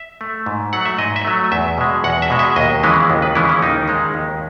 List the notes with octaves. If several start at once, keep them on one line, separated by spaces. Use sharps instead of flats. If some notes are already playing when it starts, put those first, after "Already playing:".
Already playing: E5
A3
G#2
F#3 A3 F#5
E5
G#2 D#5
E5
F#3 A3
E2 E5
B2 G#3
E2 F#5
E5
B2 G#3
E5
D#2 D#5
C#3 E3 G#3 B3
D#2
B4
C#3 E3 G#3 B3 E4
C#4
D#2 D#4
D#3 G#3
D#2